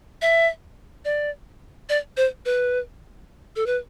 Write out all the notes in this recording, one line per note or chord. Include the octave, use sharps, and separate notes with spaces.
E5
D5
D5
C5
B4
A4
B4